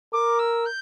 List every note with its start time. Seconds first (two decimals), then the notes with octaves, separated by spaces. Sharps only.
0.13 A#4 D6
0.39 E6
0.65 G6